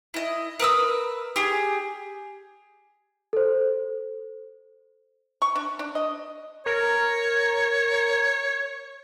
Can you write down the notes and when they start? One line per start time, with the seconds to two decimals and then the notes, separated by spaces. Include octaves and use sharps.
0.14 E4 D#5
0.60 A#4 B4 D#6 E6
1.36 G4 G#4
3.33 A4 C5
5.42 C#6
5.56 D4
5.79 D4
5.95 D#5
6.66 A#4 C#5